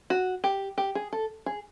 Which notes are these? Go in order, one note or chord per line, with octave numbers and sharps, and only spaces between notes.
F#4
G4
G4
G#4
A4
G#4